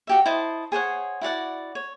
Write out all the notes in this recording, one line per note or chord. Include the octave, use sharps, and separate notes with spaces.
F#4 G4 E5
E4 C5 D#5 A5
G#4 C5 C#5 F#5
E4 F#4 D5 F#5
C#5